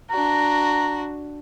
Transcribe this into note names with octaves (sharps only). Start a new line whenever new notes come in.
D4 F#4 A#5